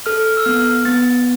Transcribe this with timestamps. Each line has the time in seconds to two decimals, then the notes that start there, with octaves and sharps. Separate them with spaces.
0.06 A4 F6
0.37 E6
0.45 B3 F6
0.85 B3 A6